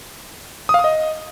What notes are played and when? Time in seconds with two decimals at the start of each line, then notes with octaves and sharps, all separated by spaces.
0.69 D#6
0.74 F5
0.79 D#6
0.84 D#5